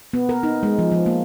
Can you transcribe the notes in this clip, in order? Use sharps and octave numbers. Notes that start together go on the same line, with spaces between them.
B3
A#4
D#4
G#3
F3
F3
A#3